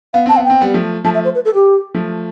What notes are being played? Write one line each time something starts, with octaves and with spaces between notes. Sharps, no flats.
B3 F5
C4 A5
B3 F5
G5
C4
G3 B3
F3 A3
F3 A3 A5
E5
C5
B4
A4
G4
F3 A3